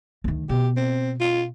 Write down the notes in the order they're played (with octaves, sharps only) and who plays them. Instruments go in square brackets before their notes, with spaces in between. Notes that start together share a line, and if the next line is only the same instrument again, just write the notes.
[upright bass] D2 D#3
[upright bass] B2 [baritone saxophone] G4
[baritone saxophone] C4
F4